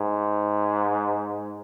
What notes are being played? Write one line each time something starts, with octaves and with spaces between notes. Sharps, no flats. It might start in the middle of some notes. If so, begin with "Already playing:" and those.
Already playing: G#2